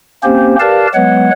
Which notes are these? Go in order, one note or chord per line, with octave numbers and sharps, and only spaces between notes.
A#3 C4 C#4 G4 C5
G4 A#4 B4 D5 F5 A5
F#3 G#3 B3 B4 C#5 F#5